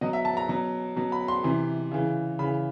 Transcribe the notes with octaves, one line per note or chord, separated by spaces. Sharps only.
B2 F#3 D#5
E5
A5
A#5
B2 F#3
B2 F#3
B5
C6
C3 E3
C#3 E3
C#3 E3 B5